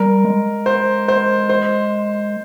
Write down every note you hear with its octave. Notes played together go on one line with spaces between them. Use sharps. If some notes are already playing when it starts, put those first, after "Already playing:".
Already playing: G3 A#4
G#3
C5
C5
C5